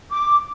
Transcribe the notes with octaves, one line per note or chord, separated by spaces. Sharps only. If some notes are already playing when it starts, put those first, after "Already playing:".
D6